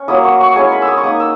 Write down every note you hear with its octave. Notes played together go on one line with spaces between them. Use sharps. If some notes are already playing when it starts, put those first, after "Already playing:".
Already playing: C#4
F#3 A#3 E4 D#6
C#6
C#6
G#3 C#4 E4 G#5
B5
E6
D#6
C#6
A#3 D#4 D#6
E6